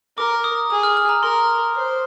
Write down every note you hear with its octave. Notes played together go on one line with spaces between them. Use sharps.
A#4 D6
D#6
G#4 D#6
F6
F6
A#5
A#4 C6
C5